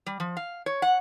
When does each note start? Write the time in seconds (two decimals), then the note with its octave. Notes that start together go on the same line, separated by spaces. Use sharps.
0.06 G3
0.20 F3
0.37 F5
0.66 C#5
0.82 F#5